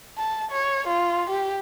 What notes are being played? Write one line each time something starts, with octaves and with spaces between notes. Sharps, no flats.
A5
C#5
F4
G4